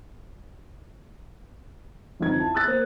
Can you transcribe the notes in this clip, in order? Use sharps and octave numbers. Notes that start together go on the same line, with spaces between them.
G1 F2 D#4 G#6
E4 A5
D#6 E6 F#6 A6
A#3 C5